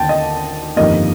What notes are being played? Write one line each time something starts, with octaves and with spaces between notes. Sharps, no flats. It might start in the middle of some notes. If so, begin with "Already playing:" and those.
Already playing: D#2 D3 G5 A5
D#5
G1 F2 D#3 G3 A#3 D#5